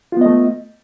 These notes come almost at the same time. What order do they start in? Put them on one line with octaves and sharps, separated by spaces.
F4 B3 D#5 A3